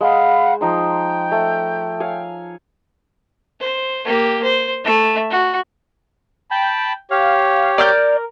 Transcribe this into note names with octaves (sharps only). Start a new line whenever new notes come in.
G#3 C5 F5 F#5 B5
F3 D#4 G5 C6
A3
C#5 F5 G#5
C5
A#3 G4
C5
A3 E5
F#4
G5 A5 B5
G4 C#5 F5
A#4 D5 F6 G6